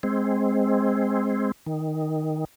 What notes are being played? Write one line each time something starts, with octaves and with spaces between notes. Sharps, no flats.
G#3 C4
D#3